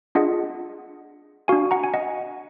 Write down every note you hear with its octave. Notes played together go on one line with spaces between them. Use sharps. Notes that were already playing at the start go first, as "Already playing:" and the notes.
D4 F4 G#4 D#5 F#5
D4 F#4 F5 G#5
F#5 A#5
G#5
D#5 F#5